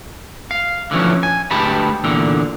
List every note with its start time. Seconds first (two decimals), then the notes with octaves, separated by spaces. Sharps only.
0.51 F5
0.91 D3 E3 F3 C#4
1.23 G#5
1.51 D2 G#3 G4 B4 A5 B5
2.04 E2 A#2 D3